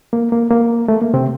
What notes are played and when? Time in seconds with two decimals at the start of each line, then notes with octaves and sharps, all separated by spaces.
0.13 A#3
0.32 A#3
0.51 A#3
0.88 A3
1.02 A#3
1.14 C3 C4